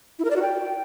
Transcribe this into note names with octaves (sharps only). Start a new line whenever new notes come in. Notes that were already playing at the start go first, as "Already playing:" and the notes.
E4
A#4
D5
F#4
G5